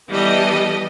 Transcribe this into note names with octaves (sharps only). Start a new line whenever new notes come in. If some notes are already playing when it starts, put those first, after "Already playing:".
E3 G3 B3 G4 A4 D#5